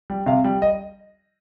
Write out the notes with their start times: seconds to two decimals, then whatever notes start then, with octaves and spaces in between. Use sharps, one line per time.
0.10 G3
0.26 C3 F5
0.44 G3
0.62 D#5